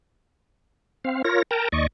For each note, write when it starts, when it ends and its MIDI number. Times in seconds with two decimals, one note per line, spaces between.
1.05 1.22 60
1.05 1.22 77
1.25 1.42 65
1.25 1.42 70
1.25 1.42 73
1.25 1.42 94
1.51 1.68 70
1.51 1.68 79
1.51 1.68 81
1.51 1.68 82
1.72 1.87 39
1.72 1.87 74
1.72 1.87 75
1.72 1.87 85